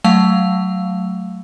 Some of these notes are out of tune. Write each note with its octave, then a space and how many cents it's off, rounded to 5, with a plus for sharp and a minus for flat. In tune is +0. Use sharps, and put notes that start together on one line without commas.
F#3 +15 A3 +0 F5 +0